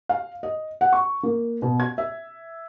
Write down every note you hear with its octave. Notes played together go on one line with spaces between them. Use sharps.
F5
D#5
F#5
C#6
A#3
B2
G#6
E5